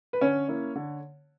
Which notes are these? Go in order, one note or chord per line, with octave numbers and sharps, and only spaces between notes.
B4
D3 C#4 C#5
A#3 C#4 E4
D3